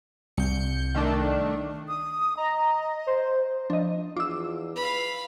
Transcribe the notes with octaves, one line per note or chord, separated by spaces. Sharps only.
C2 G6 C#7
D#3 A3 D4
D#6
D#5 A#5
C5
F3 D4 D#5
E2 F4 D6 E6
B4 F5 B5